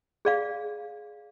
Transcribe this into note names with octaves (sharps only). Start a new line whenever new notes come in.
G#4 D5 F5